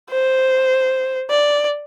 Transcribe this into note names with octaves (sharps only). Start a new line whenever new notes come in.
C5
D5